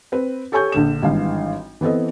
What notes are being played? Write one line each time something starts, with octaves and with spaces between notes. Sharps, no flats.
C4 B4
G4 A4 C#5 G#5 C#6 G6
A#1 D3 E7
G#1 G2 E3 F5
E3 B3 C4 A4 D#5